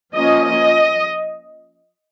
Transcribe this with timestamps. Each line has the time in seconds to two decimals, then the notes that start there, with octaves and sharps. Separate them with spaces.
0.14 F3 A#3 C#4 D#5
0.46 D#5